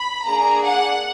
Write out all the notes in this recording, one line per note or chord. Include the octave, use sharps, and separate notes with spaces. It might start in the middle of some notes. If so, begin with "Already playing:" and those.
Already playing: B5
A#3 D4 G#4 A#5
F#5